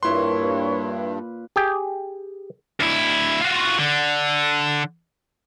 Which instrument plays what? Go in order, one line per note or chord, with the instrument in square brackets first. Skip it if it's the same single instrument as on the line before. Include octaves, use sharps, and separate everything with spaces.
[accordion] G2 [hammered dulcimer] A#2 B4 [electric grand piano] E4 C6 [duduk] C#5
[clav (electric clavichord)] G4 G#4 G5
[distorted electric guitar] D2 E4
F4 F#4
D3